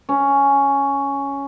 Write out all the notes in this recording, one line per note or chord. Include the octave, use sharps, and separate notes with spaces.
C#4